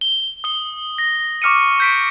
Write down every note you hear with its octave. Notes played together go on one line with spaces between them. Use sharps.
G7
D#6 G7
A#6
C#6 D6 F6 C#7 D#7
G6 B6 D7